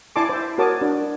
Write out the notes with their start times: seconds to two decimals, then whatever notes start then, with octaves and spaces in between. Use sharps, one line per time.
0.16 E4 D5 G#5 A5 C6 D6
0.29 C5 E5
0.58 F#4 A#4 C#5 A5 D6 D#6
0.81 D4 F#4